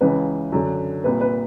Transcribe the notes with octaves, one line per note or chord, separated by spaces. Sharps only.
C#2 C#3 E3 B4
F#2 D3
C2 A#2 B4
B4